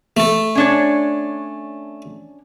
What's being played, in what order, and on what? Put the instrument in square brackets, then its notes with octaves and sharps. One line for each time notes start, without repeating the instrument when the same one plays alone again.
[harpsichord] A3 A4
[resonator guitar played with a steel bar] C#4 D4 C#5